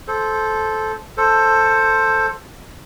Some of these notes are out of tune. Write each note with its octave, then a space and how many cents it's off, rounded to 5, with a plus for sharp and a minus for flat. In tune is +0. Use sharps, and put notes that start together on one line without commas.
A4 -15 C5 +0
A4 +10 C5 +10